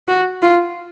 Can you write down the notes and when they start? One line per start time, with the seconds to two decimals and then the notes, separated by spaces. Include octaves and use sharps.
0.08 F#4
0.42 F4